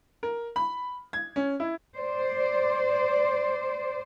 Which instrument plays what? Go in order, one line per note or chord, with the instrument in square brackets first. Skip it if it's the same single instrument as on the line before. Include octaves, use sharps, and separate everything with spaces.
[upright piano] A#4
B5
G#6
C#4
E4
[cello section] C5 D5